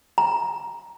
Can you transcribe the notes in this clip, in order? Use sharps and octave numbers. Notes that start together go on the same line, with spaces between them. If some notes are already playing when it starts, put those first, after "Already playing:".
A#5